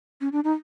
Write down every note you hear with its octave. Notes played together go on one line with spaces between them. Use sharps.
C#4
D4
D#4